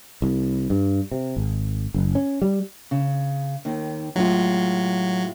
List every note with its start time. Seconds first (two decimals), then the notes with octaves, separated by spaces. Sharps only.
0.22 C2
0.70 G2
1.12 C3
1.37 G#1
1.94 F#1
2.15 C#4
2.42 G3
2.91 C#3
3.65 D#2 D#3
4.16 A2 F#3 G#3 F4